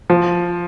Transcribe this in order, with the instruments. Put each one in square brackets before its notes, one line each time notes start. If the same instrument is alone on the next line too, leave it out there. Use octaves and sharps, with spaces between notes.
[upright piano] F3